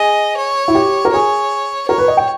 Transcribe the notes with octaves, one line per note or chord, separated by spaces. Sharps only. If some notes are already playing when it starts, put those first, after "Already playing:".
Already playing: G#4 D#5
C#5
E4
G4
A#4
G#4 C#5
A#4 C#5
B4
D#5
G5